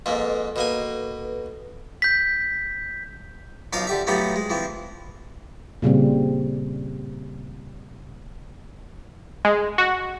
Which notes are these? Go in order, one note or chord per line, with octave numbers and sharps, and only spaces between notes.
F2 G#2 A#3 A4 B4
B2 A#3 G#5
G6 B6
B1 F3 D#4 F5 D6 D#6
D3 G4 E5
F3 F#3 A3 B3 D#4 G4
G#3
E3 F3 C4
A#2 C#3 G3 C4
G#3
F#4